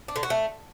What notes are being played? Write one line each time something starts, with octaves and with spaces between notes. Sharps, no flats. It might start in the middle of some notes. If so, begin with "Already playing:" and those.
D4
D3
F#4
A3